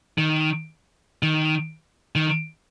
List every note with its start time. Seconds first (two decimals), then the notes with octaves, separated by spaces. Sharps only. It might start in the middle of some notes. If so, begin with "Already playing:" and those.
0.18 D#3
1.23 D#3
2.15 D#3